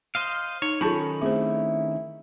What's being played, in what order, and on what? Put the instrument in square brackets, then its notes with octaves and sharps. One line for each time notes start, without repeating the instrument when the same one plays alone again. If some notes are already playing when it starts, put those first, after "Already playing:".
[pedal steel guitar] C5 D#5 F5
[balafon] D#4 [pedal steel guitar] C#5
[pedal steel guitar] D#3 C#4 B5 [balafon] F#3 F4 A5 [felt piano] A4 G6
[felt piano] A3 C4 [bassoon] E4 [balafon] G#4 C5